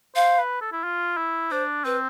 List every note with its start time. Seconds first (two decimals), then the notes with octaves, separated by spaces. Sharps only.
0.16 C5 F5
0.38 B4
0.61 A4
0.72 E4
0.84 F4
1.17 E4
1.51 D4 C5
1.85 C4 B4